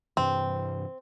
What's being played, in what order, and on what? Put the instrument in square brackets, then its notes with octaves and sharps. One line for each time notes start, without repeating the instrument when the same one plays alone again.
[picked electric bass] G2 C3 E3 [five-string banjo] C4